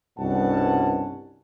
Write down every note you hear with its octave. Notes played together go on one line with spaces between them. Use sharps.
C2 G2 B2 C#4 F#5 A5